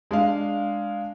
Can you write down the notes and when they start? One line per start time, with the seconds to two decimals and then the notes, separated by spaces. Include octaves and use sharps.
0.11 G#3 D4 F5